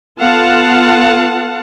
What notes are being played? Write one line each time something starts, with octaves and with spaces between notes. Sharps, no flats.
B3 F4 A4 F5 F#5 A5